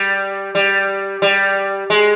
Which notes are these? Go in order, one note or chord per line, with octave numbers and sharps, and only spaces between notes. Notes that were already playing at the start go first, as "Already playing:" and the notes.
Already playing: G3
G3
G3
G#3